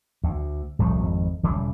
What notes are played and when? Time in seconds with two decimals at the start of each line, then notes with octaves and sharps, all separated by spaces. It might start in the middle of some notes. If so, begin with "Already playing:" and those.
0.24 D2
0.79 D1 C2 F3 A3
0.99 G#1 F2
1.43 E1 C#3 E3 G3